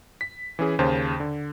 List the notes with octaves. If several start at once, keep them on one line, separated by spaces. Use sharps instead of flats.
B6
E3 C#4 G#4
D#2 C#3 C5 A5
D3